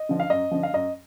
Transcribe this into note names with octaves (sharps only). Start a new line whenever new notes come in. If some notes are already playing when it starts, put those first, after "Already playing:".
Already playing: D#5
D3 F3
F5
F#2 D#5
D3 F3
F5
F#2 D#5